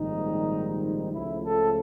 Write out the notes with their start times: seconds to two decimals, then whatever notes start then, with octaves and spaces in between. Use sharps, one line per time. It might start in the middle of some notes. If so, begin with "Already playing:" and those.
Already playing: A#1 G#2 D#3 G3 C4 D#4
0.82 D#4
1.12 C#2 C#3 F3 A3 E4
1.43 A4